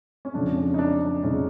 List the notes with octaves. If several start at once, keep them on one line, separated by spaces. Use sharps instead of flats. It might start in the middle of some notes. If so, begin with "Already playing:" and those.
C#4
F2 C#3 F3 G#3 D4
C#4
D#4
D4
D4
F2 C#3 F3 G#3 C#4 D#4